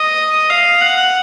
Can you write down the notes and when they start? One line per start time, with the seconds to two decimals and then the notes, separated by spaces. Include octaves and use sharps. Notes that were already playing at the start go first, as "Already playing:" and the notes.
Already playing: D#5
0.50 F5
0.81 F#5